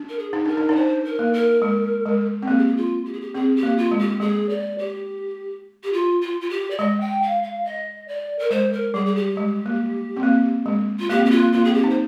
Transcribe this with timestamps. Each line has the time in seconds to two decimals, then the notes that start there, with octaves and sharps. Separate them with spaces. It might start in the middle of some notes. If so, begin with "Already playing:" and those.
Already playing: D4
0.09 A#4
0.19 G#4
0.33 D#4
0.45 D4 A#4
0.57 D#4
0.69 D#4 D5
0.76 D4 C5
1.04 A#4
1.19 A#3
1.33 A#4
1.62 G#3
2.06 G#3
2.43 C4
2.48 A#3 G#4
2.57 G4
2.67 G#4
2.76 F4
3.05 G4
3.13 G#4
3.21 G4
3.34 C4 G#4
3.56 G4
3.63 A#3
3.77 F4
3.91 G#3
3.99 G4
4.20 G#3 G#4
4.49 D5
4.78 G4
5.83 G4
5.93 F4
6.21 F4
6.41 F4
6.49 G4
6.70 D5
6.78 G#3 D#5
7.00 G5
7.22 F5
7.43 F5
7.65 D#5
8.08 D5
8.39 A#4
8.50 G#3 C5
8.73 A#4
8.94 G3 G#4
9.05 G#4
9.15 G4
9.37 G#3
9.66 A#3
10.17 C4
10.23 A#3
10.66 G#3
10.99 F4
11.09 A#3 G4
11.17 C4
11.25 A#3 G4
11.31 F4
11.37 A#3
11.52 A#3 F4
11.64 C4 G#4
11.74 G4
11.84 D#4
11.89 C5